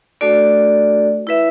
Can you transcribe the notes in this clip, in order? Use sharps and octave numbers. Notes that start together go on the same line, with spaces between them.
A3 D4 F#4 A4 D5
E4 B4 E5